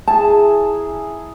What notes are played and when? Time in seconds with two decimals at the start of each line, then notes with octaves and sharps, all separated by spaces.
0.07 E4 G#4 A5 A#5